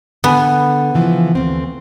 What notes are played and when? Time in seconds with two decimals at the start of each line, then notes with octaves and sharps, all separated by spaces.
0.24 D3 B3 G#5
0.94 C#3 E3 F3
1.35 D2 C4